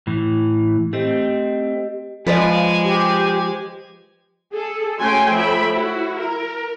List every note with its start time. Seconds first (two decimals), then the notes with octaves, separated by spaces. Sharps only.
0.07 A2 E3
0.93 A3 C4 G4 D#5
2.27 F3 G#3 B4 D5 D#5 G#5
2.84 G4
4.53 G#4 A4
5.00 A3 C#4 F#4 G5 G#5 C6
5.32 F3 A3 C#5 E5 G5 B5
5.72 E4 F#4
6.16 A#4